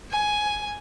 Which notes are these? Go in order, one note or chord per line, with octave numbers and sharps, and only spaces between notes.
G#5